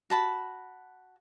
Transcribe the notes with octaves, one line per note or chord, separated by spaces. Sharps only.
F#4 A5 B5